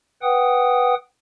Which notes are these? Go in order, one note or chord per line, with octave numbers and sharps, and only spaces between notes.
B4 F#5 G5 D#6